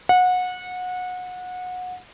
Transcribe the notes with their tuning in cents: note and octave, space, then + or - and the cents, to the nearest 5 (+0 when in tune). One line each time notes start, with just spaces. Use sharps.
F#5 -25